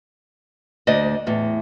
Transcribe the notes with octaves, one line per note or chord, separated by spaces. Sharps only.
D2 C5 D5 D#5
E2 A2